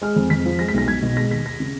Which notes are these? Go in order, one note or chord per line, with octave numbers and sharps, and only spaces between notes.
G#3 F6
F2
F2 B6
F3
G#3 A#6
B6
B1 A#6
B1 G#6
B2
G#3 A#6
D#2 B6
D#2 A#6
C#3